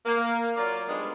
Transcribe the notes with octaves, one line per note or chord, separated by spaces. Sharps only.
A#3
F#3 F4 A#4 D5
F3 G3 G#3 B3 D4 D#4